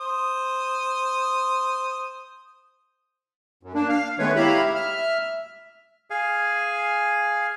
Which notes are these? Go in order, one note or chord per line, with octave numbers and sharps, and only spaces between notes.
C5 D#6
F#2
A#3 D4
F5
D#3 G#3 A3 B3 B4 C#5
E4 G4 E5 F5 A#5 B5
E5 F6
G#4 F5 G#5